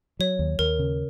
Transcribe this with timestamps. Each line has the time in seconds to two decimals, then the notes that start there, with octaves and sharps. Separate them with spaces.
0.19 F#3 C#5
0.39 D#2
0.59 D#2 A#4
0.79 C#3